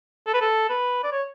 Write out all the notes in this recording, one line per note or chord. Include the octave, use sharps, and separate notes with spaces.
A4
B4
A4
B4
D5
C#5